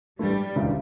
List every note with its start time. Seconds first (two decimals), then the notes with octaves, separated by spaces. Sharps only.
0.19 A1 G2 E3 G3 A3
0.56 E1 D2 C#3 E3 G3